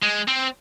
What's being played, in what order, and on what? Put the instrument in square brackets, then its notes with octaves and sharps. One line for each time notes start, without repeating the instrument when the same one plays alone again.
[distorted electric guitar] G#3
C4